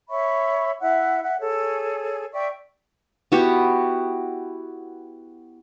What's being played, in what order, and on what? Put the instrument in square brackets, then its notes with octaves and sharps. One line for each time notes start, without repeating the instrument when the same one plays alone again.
[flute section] C#5 E5 B5 C#6
E4 E5 F#5
E5 F#5
G#4 A4 C#5
D5 E5 G5 C#6
[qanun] B3 E4 F#4 G4